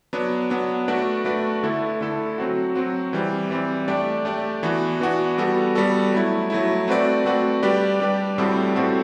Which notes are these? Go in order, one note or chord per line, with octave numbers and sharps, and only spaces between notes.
F#3 B3 D4
F#3 B3 D4
A3 D4 F#4 B4 D5
A3 D4 F#4 B4 D5
D3 A3 E4 A4
D3 A3 E4 A4
F#3 C4 F#4
F#3 C4 F#4
E3 G3 C4
E3 G3 C4
A3 D4 G4 D5
A3 D4 G4 D5
E3 B3 D4 F#4
E3 B3 D4 F#4
G3 B3 F#4 A4
G3 B3 F#4 A4
F#3 A3 E4
F#3 A3 E4
A3 C4 F#4 B4 D5
A3 C4 F#4 B4 D5
G3 D4 G4 B4 D5
G3 D4 G4 B4 D5
A2 G3 C4 F#4 A4
A2 G3 C4 F#4 A4